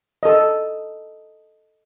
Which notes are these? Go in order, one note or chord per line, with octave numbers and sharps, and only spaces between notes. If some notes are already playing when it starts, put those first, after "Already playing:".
A4 D#5